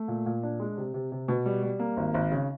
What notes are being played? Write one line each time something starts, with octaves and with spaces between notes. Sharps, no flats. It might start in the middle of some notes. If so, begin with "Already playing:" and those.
Already playing: A3
A#2
A#2
D4
G#3
C3
C3
C3
B2
G3
G3
A#3
G#1
G#1
C#3